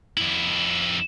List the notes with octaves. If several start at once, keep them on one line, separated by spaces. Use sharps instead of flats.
F2 E4